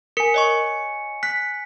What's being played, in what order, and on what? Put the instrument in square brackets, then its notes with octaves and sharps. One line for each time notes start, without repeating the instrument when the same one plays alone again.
[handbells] A#4 [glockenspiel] G#5 C#7
[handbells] C#5 D#5 C#6
[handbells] F#6 [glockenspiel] B6